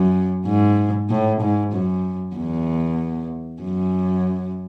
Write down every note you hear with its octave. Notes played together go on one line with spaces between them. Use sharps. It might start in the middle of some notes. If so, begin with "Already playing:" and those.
Already playing: F#2
G#2
A2
G#2
F#2
E2
F#2